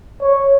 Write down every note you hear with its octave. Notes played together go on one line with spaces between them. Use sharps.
C#5